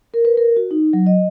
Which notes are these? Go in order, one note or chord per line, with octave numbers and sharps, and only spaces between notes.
A#4
B4
A#4
F#4
D#4
F#3
D#5